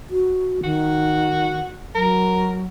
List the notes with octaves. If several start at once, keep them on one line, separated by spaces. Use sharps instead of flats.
F#4
D#3 F#4
F#3 A#4